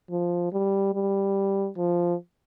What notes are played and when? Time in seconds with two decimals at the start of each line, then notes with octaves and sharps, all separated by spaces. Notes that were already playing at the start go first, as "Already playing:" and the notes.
0.10 F3
0.52 G3
0.94 G3
1.77 F3